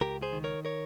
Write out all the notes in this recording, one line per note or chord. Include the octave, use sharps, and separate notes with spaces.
C#2 G4 A#4
G#4 C5
D#3
A#4 C#5
A#4 C#5